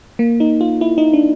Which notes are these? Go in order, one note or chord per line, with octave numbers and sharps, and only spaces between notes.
A#3
D#4
F4
E4
D#4
D4